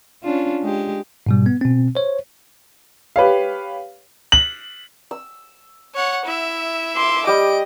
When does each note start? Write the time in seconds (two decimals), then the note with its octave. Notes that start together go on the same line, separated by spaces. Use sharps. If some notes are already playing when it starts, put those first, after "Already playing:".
0.23 C#4 D4 F4
0.62 G#3 G4
1.26 G#2 B2 G3
1.46 B3
1.61 B2 C4
1.95 C5 C#5
3.16 G4 B4 C#5 F5
4.32 F#7
5.11 E6
5.95 C#5 F#5
6.26 E4 E5
6.96 C6 D6
7.27 G3 G4 D#5 D7